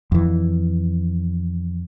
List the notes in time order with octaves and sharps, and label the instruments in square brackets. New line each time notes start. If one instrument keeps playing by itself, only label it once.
[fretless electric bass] F2 E3